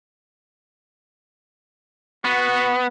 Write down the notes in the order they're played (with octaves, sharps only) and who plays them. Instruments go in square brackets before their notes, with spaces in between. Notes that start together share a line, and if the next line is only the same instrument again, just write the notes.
[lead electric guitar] B3 [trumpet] F#4